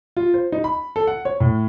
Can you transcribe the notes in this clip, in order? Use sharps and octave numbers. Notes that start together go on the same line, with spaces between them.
F4
C5
D#4
B5
A4
F#5
C#5
A2